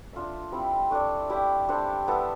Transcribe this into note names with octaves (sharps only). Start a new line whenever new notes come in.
D4 F4 A4 E5
G3 C4 E4
A3 D4 A4 D5
E4 G4 D5
G3 D4 A4 C5
B3 E4 A4